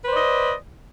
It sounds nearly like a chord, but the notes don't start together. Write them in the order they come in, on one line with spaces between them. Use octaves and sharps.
B4 C5 D5 D#5